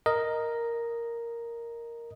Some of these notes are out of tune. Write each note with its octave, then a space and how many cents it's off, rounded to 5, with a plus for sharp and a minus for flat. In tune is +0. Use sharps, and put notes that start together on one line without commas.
A#4 +0 D#5 +0